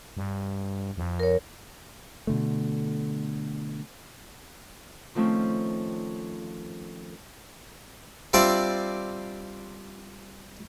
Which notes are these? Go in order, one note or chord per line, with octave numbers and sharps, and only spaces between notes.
G2
F2
A#4 C#5
B2 D3 A3
D#3 F3 A3 C4 C#4
G3 C4 D4 F4 D5 E5